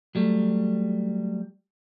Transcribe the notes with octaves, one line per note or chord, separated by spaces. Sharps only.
F#3 G3 A3